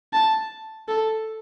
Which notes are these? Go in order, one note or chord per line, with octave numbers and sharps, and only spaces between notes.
A5
A4